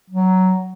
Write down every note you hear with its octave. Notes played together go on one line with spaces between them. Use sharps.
F#3